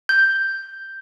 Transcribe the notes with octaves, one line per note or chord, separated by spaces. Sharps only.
G6